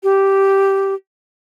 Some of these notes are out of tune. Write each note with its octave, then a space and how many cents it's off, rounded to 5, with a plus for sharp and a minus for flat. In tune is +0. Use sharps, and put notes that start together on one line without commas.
G4 -5